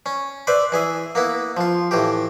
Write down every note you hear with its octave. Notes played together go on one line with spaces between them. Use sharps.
C#4
B4 C5 D5 E5
E3 G#4 E5
A#3 B3 E4
F3 F4
A2 E3 G4